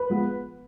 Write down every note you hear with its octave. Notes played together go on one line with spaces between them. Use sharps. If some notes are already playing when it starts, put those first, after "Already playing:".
Already playing: B4
F3 G#3 B3